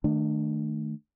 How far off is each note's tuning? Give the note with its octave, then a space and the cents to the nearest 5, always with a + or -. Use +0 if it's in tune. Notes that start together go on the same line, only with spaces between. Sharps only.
D#3 -15 A3 +0 D4 +25